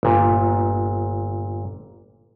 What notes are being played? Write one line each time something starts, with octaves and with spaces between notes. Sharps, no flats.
G1 A#2